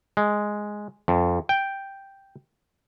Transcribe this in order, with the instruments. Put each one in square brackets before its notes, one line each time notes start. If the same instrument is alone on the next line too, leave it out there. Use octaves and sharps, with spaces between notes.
[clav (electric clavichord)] G#3
F2
G5